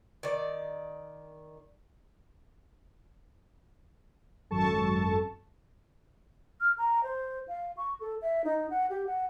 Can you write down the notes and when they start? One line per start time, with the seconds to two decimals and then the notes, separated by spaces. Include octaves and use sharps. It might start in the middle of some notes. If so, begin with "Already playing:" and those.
0.23 D#3 D5
4.50 G#1 F#2 A4 A5 C#6
6.61 F6
6.78 A#5
7.03 C5
7.48 F5
7.77 C#6
8.00 A4
8.22 E5
8.44 D#4
8.70 F#5
8.90 G4
9.07 F#5